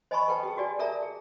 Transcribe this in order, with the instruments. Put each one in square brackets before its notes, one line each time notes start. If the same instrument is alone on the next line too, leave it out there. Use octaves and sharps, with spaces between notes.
[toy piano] C5 D#5 G#5 A5 B5 C#6
A4 B4 G5 A5
G4 G#4
F#4 G4 D5 G#5
A4 A#4 D5 E5 A5 A#5
G#4